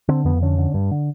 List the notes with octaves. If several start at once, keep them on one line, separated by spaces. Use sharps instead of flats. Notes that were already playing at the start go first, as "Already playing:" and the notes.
D3 C4
F2 B3
D3 C#4
D3
G2
D3